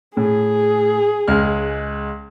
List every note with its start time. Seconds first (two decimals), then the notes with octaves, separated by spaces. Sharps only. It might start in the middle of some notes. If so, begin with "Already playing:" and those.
0.17 A2 G#4
1.28 C#2 G#3 F6